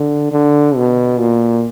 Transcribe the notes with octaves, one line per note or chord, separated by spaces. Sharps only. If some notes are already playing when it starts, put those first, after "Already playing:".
Already playing: D3
D3
B2
A#2